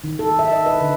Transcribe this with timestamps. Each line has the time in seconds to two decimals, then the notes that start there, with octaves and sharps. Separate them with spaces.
0.04 D#3
0.19 A4
0.39 E5
0.52 D#5
0.66 B4
0.81 D3